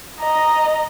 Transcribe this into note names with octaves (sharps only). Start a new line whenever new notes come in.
D#5 A#5